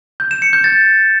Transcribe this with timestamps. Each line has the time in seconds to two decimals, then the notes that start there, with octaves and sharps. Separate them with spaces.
0.20 G6
0.31 E7
0.42 C#7
0.53 G6
0.64 A6